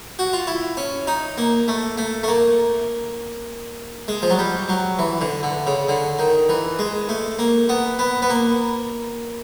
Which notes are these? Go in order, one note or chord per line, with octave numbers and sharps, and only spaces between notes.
F#4
F4
E4
C#4
D#4
A#3
A3
A3
A3
A#3
G#3
F3
F#3
G3
F#3
E3
D3
D3
C#3
D3
D#3
E3
G#3
A3
A#3
B3
B3
B3
A#3